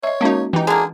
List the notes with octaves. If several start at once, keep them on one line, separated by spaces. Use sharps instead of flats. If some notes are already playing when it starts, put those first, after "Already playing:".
C#5 D#5 E5
G#3 A#3 C#4 D#4 F#4
E3 D#4 G4
D3 A#3 G#4